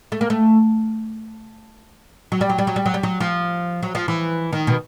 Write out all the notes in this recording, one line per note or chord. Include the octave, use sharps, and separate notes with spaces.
A3
A#3
A3
F#3
G3
F#3
G3
F#3
G3
F#3
G3
F#3
F3
F#3
F3
E3
D#3
B2